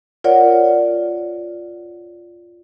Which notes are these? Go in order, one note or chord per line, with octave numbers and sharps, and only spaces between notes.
F4 A#4 C#5 D5 F#5